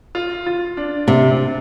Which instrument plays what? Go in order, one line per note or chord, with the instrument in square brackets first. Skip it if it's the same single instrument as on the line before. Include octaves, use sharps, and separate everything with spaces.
[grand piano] F4
F4
D4
[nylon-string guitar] C3